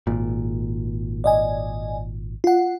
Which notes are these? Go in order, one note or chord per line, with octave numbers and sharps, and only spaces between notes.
G#1 A#2
D5 D#5 G#5
F4 F#5